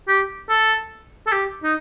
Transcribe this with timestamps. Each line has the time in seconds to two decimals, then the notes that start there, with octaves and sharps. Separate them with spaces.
0.08 G4
0.49 A4
1.27 A4
1.32 G4
1.63 D#4